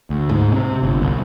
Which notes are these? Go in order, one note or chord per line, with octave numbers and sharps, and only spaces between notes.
D2
G#2
C3
G1
C2